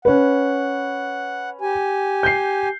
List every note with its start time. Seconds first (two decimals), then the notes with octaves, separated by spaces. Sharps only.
0.05 C#4 B4 F#5
1.61 G4 G#5
2.23 G6 C7